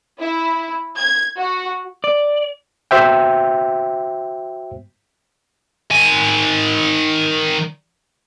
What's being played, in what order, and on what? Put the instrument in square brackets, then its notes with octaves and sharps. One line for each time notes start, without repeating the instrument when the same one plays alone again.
[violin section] E4
G#6
F#4
[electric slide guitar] D5
[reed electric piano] F#4 C5 E5 G5
[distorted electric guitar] D#3 G#5